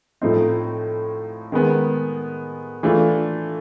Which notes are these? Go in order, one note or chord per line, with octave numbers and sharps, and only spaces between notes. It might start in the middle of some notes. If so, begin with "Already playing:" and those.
A2 F3 A3 C4 D#4
D#3 G#3 B3
E3 A3 D4 F4